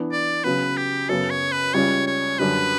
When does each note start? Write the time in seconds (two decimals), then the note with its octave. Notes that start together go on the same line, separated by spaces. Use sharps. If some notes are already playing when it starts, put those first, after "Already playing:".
Already playing: E3 B3 D4
0.12 D5
0.44 C#3 F#3 B3 B4
0.77 G4
1.09 F#2 C#3 F#3 B3 A4
1.30 C#5
1.52 B4
1.74 C#2 C#3 G3 C#4 C#5
2.07 C#5
2.39 F#2 D3 G3 B4